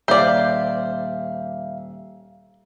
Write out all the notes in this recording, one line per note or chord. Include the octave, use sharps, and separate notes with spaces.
D#1 C5 D5 E5 F5 G6